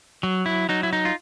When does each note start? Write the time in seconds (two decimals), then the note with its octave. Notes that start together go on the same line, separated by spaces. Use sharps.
0.23 F#3
0.46 E4
0.69 F#3 D#4
0.83 E4
0.93 D#4
1.05 F4